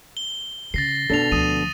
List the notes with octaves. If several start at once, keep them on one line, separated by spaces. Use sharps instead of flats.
G7
C#3 A6 A#6 C7
B2 D#3 D4 A4 A6 F7
D2 F3 D#6 D#7